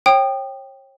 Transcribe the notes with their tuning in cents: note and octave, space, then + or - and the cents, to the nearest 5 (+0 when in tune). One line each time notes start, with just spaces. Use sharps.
C#5 -35 G5 +0 D#6 -30